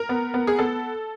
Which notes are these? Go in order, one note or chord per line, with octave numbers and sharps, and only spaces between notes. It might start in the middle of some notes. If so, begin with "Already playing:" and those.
Already playing: A#4
B3
B3
G#4
B3 A4